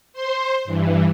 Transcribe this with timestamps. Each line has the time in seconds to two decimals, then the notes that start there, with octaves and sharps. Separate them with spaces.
0.13 C5 C6
0.65 G2 E3